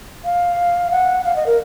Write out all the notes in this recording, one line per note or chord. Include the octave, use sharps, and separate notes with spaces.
F5
F#5
F5
D#5
A#4